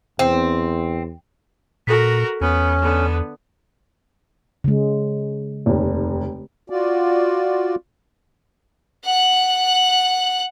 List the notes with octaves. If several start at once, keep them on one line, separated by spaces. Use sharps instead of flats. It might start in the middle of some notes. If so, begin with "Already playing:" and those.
E2 C4
A#2 F#4 A4 A#4 B6
E2 B3 C#4
D3 B3
C#3 G#3
F1 D#2
F4 F#4 D5
F#5 F#6